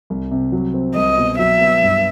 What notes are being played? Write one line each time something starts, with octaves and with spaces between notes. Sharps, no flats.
C2
C3
F#3
C4
C2 D#5
B2
F#3 E5
B3
G2